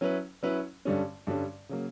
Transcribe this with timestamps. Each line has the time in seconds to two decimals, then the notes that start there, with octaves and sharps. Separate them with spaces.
0.01 F#3 C#4 E4 B4
0.43 F#3 C#4 E4 B4
0.85 G2 D3 G3 C#4
1.27 G2 D3 G3 C#4
1.69 C#3 F#3 A#3